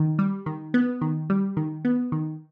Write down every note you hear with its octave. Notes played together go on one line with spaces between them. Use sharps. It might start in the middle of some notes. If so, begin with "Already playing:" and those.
Already playing: D#3
G3
D#3
B3
D#3
G3
D#3
B3
D#3